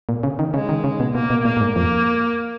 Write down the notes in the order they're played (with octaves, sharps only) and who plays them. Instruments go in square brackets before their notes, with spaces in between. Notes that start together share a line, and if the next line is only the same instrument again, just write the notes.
[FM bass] A#2
C#3
D#3
[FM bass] C#3 [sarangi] G#3
[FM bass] D#3
C#3
B2
[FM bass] B2 [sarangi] A#3
[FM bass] B2
[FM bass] A#2 [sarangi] A#3
[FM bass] A#2
G#2
[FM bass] F2 [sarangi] A#3